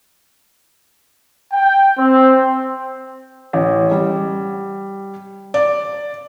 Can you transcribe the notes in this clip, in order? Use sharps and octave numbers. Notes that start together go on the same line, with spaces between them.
G5
C4
A1
G3
D5